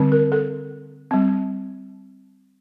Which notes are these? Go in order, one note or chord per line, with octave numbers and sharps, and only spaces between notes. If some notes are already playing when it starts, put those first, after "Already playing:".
Already playing: D3 G3 C4
A#4
A4
G3 C4